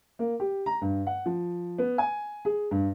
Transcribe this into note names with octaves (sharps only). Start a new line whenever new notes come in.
A#3
G4
A#5
G2
F#5
F3
B3
G#5
G#4
G2